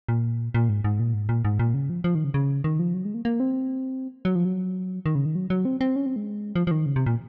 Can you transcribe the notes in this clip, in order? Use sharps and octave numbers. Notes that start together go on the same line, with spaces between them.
A#2
A#2
G#2
G#2
A#2
G#2
A#2
G#2
A#2
C#3
F3
F3
D#3
C#3
C#3
D#3
F3
F#3
G#3
A#3
A#3
C4
F#3
F3
F#3
D#3
C#3
D#3
F#3
F#3
C4
C4
C#4
C4
G#3
F3
F3
D#3
C#3
C3
A#2